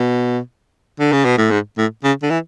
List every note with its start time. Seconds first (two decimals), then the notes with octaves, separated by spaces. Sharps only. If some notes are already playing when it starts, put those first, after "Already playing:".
Already playing: B2
0.99 D3
1.12 C#3
1.25 B2
1.38 A2
1.51 G#2
1.78 A2
2.04 C#3
2.22 D3
2.30 E3